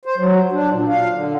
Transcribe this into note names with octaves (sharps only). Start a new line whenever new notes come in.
C5
F#3
D4
A#2
F5
D3